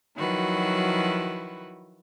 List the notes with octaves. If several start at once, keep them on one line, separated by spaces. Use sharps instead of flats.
D#3 F3 F#3 E4 F#4 B4